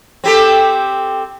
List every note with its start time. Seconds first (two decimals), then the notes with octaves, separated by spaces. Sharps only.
0.24 C4 G4 A4